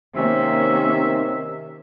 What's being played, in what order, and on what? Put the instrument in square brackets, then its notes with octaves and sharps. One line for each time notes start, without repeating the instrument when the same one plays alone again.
[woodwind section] C3 [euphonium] D#3 [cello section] A#3 C#4 [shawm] E5